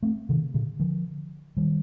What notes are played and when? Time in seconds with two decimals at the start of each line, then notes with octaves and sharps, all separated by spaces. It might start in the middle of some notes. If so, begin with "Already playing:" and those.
0.03 A3 C4
0.29 C3 D#3
0.54 A#2 D3
0.79 D3 F3
1.57 D#3 G3